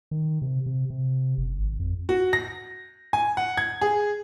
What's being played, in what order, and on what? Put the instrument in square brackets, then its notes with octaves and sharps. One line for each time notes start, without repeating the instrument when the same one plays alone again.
[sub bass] D#3
C3
C3
C3
F#1
G#1
F2
[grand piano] F#4
A#6
G#5
F#5
G#6
G#4